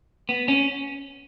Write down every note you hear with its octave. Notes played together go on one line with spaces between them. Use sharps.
B3
C#4